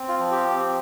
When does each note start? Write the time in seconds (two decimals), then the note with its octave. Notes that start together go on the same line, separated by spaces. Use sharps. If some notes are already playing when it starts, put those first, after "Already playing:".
Already playing: C4
0.08 F4
0.20 F3
0.31 G4
0.55 C4